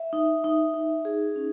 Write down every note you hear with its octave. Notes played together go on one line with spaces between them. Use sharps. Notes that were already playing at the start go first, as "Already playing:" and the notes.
Already playing: E5
D#4
D#4
D#4
G#4
C#4